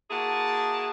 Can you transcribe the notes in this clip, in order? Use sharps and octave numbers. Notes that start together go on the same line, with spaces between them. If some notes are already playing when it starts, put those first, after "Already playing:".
A#3 E4 F#4 G#4 A5